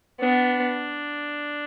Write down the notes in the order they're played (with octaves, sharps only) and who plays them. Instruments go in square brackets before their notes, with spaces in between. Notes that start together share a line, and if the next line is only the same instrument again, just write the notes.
[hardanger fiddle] B3 [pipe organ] D4